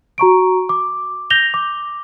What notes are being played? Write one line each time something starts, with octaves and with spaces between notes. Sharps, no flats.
F#4 A#5 C#6 D7
D6
G6 A#6 F7 G7
D6